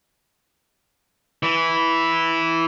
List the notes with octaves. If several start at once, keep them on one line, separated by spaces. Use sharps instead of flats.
E3 E4